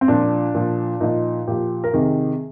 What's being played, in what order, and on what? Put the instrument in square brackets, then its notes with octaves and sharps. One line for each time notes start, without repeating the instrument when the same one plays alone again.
[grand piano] C4
A#2 F3 D4
A#2 F3
A#2 F3 D#4
A#2 F3 G4
A#4
C3 D#3 G#4